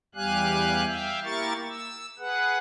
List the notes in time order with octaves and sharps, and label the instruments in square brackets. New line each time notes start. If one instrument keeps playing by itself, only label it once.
[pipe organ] E2 G3 G4 F5 G#5 F#6
E5 F5 G5
A#3 E4 G4 A#4 C#6 A6
E6
G#4 B4 F#5